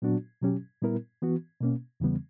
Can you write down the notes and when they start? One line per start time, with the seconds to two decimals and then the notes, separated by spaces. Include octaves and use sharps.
0.02 A#2 F#3 B3 D4 F#4
0.42 B2 F#3 C#4 G4
0.82 A#2 G3 B3 E4 A#4
1.22 E3 B3 F#4
1.61 B2 A#3 C#4
2.00 E2 C#3 E3 G3 B3